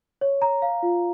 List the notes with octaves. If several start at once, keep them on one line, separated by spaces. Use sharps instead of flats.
C#5
A#5
F5
F4